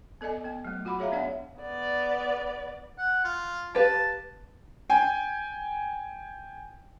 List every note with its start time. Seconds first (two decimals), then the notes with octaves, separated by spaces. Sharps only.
0.21 B3 A4 D5 D#5 G#5
0.44 B3 G5
0.65 F#3 A3
0.85 F4 F#4 F#5 B5 D6
0.99 G#4 C#5 E5 F5 A#5
1.12 B3 D4 C#5 D5 E5 F#5
1.60 B3 D5
2.98 F#5
3.25 F4
3.75 G4 B4 F5 A5
4.90 G5 G#5